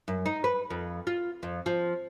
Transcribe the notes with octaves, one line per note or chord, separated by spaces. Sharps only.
F#2
D#4
B4
F2
F4
F2
F3